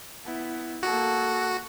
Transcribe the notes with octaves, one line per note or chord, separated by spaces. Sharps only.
B3 E4
A#3 F#4 A4